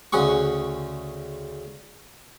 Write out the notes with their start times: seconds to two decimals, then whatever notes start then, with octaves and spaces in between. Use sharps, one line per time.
0.13 D2 C#3 G#4 F#5 C#6